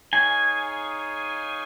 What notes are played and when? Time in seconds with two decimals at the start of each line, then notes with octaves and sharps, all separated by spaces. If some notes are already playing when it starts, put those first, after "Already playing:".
0.13 D#4 G#4 C#5 F5 G#5